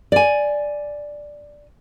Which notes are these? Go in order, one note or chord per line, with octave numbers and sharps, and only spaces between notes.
D5 G#5